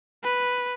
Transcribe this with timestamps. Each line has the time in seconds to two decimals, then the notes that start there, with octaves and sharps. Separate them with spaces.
0.24 B4